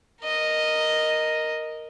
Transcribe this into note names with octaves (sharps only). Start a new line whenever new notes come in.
A#4 D#5